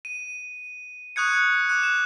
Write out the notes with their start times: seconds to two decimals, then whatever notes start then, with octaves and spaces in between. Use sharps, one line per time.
0.05 D#7
1.16 C#6 D#6 F#6 G#6 C#7
1.69 D6 F#6
1.83 E7